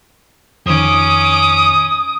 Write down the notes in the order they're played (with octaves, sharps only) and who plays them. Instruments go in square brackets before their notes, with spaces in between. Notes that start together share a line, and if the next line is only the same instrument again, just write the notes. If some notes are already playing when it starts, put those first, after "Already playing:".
[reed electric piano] F2 D#3 [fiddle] C#4 D6 [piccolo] D#6